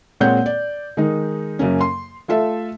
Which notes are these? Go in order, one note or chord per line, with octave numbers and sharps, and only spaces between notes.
A#2 G#3 C4 C#5 F#5 G6
D5
D#3 G#3 D#4
F#2 C#3 A#3 C#4
C6
A3 F4 A4 E5